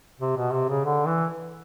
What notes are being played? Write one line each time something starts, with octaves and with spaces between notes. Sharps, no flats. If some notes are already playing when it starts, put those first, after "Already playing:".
C3
B2
C3
C#3
D3
E3